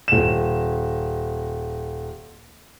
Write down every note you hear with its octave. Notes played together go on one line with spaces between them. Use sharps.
D#1 E7